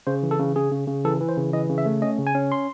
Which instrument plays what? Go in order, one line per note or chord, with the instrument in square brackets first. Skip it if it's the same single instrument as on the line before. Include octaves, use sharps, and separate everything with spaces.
[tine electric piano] C#3 C5
E3
A4
C#3
C#3 G#4
C#3
C#3
E3 A4
E3
C5
C#3
E3 D#5
C#3
E5
A3
C#4 D#5
C#3
G#5
C#4
C6